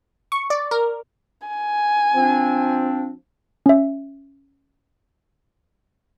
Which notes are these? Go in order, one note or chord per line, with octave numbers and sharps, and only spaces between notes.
C#6
D5
A#4
G#5
F3 C4 D4
C#4 E5